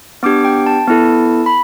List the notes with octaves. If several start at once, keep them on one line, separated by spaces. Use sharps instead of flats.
B3 D4 G4 D6
G5
A5
B3 E4 A4
B5